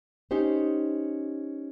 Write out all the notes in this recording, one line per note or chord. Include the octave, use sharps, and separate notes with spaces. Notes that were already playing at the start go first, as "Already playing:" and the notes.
C#4 D#4 G4 C5